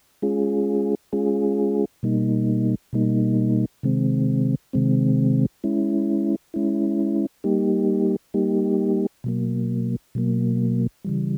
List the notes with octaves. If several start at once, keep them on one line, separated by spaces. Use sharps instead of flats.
G#3 C#4 F4 G#4
G#3 C#4 F4 G#4
B2 G3 A#3 D#4
B2 G3 A#3 D#4
C3 D#3 G#3 C4
C3 D#3 G#3 C4
G#3 C#4 E4
G#3 C#4 E4
G3 A#3 D#4 G4
G3 A#3 D#4 G4
B2 F#3 A#3
B2 F#3 A#3
C#3 E3 G3